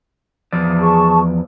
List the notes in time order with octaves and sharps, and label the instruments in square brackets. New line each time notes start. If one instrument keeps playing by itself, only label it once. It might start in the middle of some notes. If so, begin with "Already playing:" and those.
[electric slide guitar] E2 F3 D5
[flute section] G#4 A5 C#6